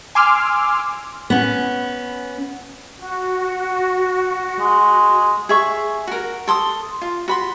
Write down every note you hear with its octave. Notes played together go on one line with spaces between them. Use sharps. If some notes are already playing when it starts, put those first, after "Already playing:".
G#5 C6 D6 E6 F6
B3 C#4
F#4
G#3
G#4 E5 C#6
F#4 A#4
A4 C6 D6 D#6
F4
F#4 B5 C6